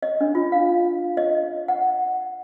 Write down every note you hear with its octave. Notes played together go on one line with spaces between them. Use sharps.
D#5
D4
F4
F5
D#5
F#5